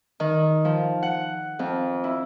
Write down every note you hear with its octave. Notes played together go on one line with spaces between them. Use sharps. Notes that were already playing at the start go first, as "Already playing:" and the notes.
D#3
F3
F#5
F2
E4